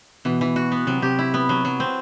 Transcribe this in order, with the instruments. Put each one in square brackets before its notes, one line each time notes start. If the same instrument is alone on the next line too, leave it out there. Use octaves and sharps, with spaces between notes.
[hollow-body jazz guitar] B2 [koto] E3
[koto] E3
F#4
B3
[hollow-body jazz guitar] C3 [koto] F#3
[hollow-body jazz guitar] C3 [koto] G4
[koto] E4
B3
F#3
F#3
C4